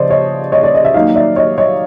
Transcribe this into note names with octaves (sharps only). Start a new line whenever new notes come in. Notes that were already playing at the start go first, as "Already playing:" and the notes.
Already playing: C#3 F3 C5 D5 D#5
C#5 D#5
C#5 D#5
D5
D#5
E5
D#3 F#3 A#3 D#5 F5
D5 E5
C#5 D#5
C#5 D#5